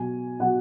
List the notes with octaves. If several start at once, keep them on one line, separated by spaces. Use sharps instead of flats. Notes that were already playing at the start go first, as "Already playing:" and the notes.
Already playing: B2 F#3 G#5
B2 F#3 F#5